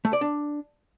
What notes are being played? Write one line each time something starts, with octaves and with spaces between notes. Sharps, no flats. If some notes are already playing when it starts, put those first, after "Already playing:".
A3
D5
D4